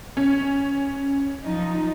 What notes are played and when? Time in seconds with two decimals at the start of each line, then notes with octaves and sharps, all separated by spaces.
0.17 C#4
1.43 F3 D#4